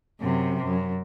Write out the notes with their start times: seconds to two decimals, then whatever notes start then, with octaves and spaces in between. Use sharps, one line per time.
0.21 F#2 C3
0.64 F#2